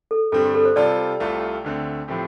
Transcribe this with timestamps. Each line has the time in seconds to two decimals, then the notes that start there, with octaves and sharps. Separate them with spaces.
0.11 A4
0.32 G2 D3 G3 C4 A4
0.44 G4
0.55 A4
0.65 C5
0.76 C3 G3 F4 A4 D5
1.20 C2 C3 A3 F4 A4
1.64 D2 D3 A3 C4
2.08 A2 F3 A3 C4 G4